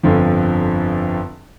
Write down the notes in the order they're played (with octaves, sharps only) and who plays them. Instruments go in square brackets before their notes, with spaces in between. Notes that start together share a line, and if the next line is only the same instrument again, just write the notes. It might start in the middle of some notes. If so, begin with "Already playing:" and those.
[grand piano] G1 F2 D3 F3